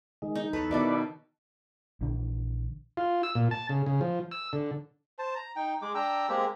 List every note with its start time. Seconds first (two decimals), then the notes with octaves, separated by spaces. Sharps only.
0.22 D#3 G#3
0.35 D#4
0.53 E2 A4 B4 C#5
0.71 B2 D#3 E4 A4 B4 D5
2.01 A#1 D3 E3 D4
2.97 F4
3.23 E6
3.35 A#2
3.51 A5
3.69 C#3
3.86 C#3
4.01 F3
4.32 E6
4.53 D3
5.19 C5 A5
5.35 A#5
5.56 D#4 G5
5.82 G#3 D6
5.95 D4 G5 A#5 E6
6.29 G#3 A#3 C4 G4